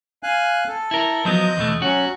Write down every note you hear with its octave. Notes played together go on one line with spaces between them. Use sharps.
F5 G#5 F#6
A4
E4 A#4
F3 F#3 B3 D#5 G6
E2 B2 A3
F#3 C#4 F#4